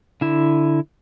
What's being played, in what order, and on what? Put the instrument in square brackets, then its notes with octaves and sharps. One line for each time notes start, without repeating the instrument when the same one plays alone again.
[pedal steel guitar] D3 E4